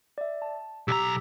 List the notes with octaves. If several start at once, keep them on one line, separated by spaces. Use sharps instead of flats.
D5 E5
A5
B1 G4 A#5 E6 B6